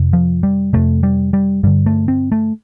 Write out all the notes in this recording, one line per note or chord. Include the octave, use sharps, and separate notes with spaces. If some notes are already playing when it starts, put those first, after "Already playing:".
Already playing: F2 C3
F3
G3
F2 C3 A3
G3
G3
G2 D3 G3
A3
C4
A3